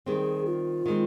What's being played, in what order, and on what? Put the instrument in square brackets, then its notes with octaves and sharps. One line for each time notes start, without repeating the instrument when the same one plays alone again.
[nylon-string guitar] D#3 G3 C4 [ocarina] G#4
[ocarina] F4
[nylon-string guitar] D#3 G#3 C4